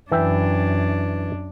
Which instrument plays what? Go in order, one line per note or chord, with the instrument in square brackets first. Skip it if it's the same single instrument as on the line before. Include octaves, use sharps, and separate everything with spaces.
[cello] F#2 D4 [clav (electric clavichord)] E3 E5 G5